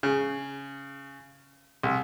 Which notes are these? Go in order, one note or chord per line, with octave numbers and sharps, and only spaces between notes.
C#3
C2